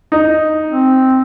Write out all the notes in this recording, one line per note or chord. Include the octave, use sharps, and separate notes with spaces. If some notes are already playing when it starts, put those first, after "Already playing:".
D#4
C4